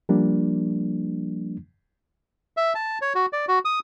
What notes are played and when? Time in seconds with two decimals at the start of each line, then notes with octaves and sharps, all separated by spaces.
0.09 F3 G3 A#3 D4
2.57 E5
2.75 A5
3.01 C#5
3.15 F#4
3.33 D5
3.48 F#4
3.65 D#6